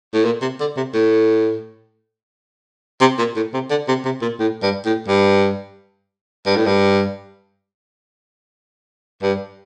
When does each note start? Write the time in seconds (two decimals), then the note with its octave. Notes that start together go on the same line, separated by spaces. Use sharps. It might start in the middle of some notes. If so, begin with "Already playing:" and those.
0.14 A2
0.25 A#2
0.42 C3
0.60 D3
0.77 C3
0.94 A2
3.01 C3
3.18 A#2
3.36 A2
3.54 C3
3.70 D3
3.88 C3
4.05 C3
4.22 A#2
4.40 A2
4.63 G2
4.86 A2
5.08 G2
6.46 G2
6.56 A2
6.66 G2
9.23 G2